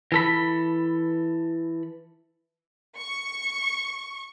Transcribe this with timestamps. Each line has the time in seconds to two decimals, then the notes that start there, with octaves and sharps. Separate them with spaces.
0.12 E3 A4 B5
2.97 C#6